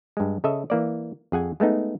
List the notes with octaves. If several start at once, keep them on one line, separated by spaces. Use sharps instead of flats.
G2 G#3
C#3 A4 D#5 E5
E3 A#3 D5
F2 G#4 F#5 G#5
G#3 A3 B3 D#4